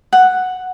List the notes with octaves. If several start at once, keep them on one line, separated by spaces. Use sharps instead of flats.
F#5